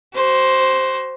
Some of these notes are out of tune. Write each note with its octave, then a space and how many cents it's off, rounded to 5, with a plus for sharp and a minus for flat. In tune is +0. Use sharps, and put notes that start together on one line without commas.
F#4 +35 C5 +0